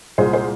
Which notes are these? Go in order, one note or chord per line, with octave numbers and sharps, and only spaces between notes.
C2 A#2 G#3 G#4 C5
G#4 C5